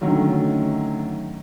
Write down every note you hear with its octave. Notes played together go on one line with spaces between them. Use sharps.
D3 D#3 F#3 A3 C#4